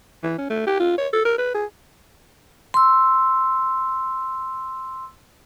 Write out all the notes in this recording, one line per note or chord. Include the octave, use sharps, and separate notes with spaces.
E3
C#4
A3
G4
F4
C#5
A4
A#4
B4
G#4
C6 E6